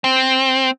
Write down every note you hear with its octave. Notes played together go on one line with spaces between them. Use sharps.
C4